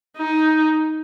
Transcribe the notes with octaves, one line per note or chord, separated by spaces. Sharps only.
D#4